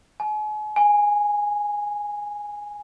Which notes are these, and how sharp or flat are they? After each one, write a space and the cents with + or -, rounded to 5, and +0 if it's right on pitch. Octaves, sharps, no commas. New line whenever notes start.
G#5 +40
G#5 -5